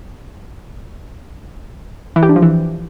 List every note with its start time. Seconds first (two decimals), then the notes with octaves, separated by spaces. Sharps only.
2.16 E3
2.23 G4
2.29 D4
2.36 F3
2.42 E3